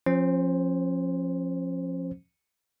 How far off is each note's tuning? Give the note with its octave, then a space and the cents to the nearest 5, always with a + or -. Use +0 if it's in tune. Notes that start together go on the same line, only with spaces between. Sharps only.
F3 +10 C#4 -40 C5 +0